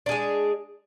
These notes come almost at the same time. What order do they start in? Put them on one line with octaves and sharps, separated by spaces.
D4 G#4 G#3